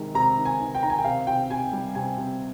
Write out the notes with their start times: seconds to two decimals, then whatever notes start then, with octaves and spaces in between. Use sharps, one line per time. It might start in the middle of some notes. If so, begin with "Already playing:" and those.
Already playing: C3 D#3 G#3
0.14 C3 A#5
0.37 D#3
0.45 G#5
0.60 D#3
0.75 G5
0.83 D#3 A#5
0.90 G#5
0.98 G5
1.04 C3 F5
1.27 C3 G5
1.50 C3 G#5
1.73 G3
1.95 C3 G#5
2.18 C3